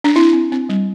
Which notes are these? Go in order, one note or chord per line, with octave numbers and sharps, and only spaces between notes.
D4
C4 E4
C4
C4
G3